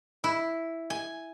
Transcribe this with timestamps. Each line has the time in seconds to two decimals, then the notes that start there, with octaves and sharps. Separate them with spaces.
0.24 E4
0.90 G#5